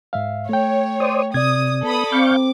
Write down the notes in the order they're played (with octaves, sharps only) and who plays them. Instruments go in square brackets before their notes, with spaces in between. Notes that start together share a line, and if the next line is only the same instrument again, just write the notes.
[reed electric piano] G#2 E5 F5
[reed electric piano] A3 G5 [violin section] C#5
[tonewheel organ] C5 D5 D#6
[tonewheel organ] C3 [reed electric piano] D5 G#6 [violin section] D#6
[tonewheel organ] B3 [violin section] A4 B5 D#6
[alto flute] C4 [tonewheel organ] F5 C#6 G6 [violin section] D6